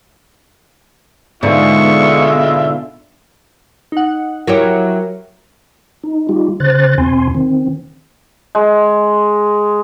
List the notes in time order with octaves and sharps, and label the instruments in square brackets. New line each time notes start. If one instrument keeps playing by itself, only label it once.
[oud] G#2 D3 [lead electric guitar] B2 [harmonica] G#3 F4 E5 [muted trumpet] C#6
[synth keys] D#4 F#5
[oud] F#3 E4 G4 [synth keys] A#4 C#5 A#5
[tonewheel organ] D#4
G3 D#4 F4 G4
C#3 C5 F#6 A6
E2 B2 C4 G#5 C6
D#3 C4
[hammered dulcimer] G#3